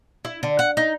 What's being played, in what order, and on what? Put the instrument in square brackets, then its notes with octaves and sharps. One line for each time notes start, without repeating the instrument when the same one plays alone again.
[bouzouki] E4
D3
F#5
D#4